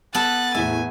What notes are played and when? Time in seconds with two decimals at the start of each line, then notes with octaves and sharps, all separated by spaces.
0.14 B3 A4 A5 F#6 A6
0.55 E2 A2 A3 E5 G#5